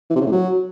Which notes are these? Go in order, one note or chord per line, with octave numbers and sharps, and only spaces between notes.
E3
C3
C#3
A2
F#3